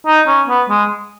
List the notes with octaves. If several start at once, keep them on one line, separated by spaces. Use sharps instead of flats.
D#4
C#4
B3
G#3